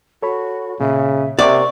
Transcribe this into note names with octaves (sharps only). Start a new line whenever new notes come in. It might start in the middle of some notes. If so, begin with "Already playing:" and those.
F#4 A4 C#5 B5
A#2 C#3 E5
C3 A#4 D5 E5 F#5 C#6